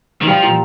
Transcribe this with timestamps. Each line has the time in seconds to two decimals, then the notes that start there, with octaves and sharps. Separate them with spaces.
0.22 D#3
0.27 F3 G3
0.43 A#2